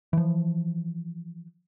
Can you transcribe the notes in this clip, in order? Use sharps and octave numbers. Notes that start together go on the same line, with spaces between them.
E3 F3